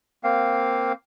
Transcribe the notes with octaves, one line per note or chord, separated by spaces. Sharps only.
A#3 C4 F5